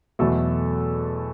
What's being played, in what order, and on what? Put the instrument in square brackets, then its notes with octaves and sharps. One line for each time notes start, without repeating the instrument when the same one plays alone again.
[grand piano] E2 B2 F#3 A3 A4